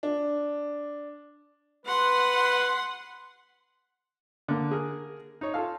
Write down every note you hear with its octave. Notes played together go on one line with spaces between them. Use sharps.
D4
B4 F#5 C6
D3 A#3
G#4 A#4
D#4 C#5
F4 A4 F5